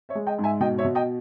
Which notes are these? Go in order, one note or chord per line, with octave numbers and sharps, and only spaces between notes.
C#5 E5
G#3
D#5 G5
G#2
E5 G#5
B2 D#5 G5
C#5 E5
B2
D#5 G5